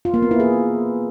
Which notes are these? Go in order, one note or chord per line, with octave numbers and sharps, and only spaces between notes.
F4
A#3
B3
E4
G#4